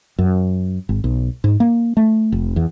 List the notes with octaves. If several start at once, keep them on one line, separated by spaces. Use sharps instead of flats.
F#2
G#1
B1
G#2
A#3
A3
F1
E2